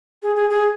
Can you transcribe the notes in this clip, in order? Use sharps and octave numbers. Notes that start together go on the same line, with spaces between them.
G#4
G#4
G#4